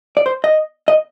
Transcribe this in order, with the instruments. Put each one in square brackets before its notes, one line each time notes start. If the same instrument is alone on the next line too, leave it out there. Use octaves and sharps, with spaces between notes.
[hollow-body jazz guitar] D5
C5
D#5
D#5